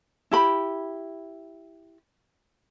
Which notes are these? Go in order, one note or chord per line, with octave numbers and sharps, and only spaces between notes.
E4 G4 B5